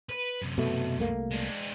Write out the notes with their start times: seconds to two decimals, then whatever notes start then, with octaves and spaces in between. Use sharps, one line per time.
0.09 B4
0.42 F#2 C3
0.58 B2 A3
0.99 C2 A3 A#3
1.31 G#3 D4